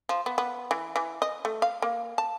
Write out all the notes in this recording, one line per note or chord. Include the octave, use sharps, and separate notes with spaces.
F3
B3
B3
E3
E3
D#5
A3
F5
A#3
A5